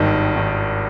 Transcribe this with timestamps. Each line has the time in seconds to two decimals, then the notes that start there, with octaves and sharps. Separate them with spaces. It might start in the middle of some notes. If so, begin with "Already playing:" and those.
Already playing: G#1 G2 D#3 D#4
0.36 D#3